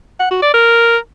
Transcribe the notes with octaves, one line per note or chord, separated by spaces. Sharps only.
F#5
F#4
D5
A#4